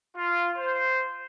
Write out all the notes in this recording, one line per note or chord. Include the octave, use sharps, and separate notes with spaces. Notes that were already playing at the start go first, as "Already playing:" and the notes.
F4
C5